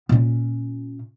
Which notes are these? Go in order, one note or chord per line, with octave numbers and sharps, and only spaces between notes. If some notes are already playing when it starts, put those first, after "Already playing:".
A#2 C#4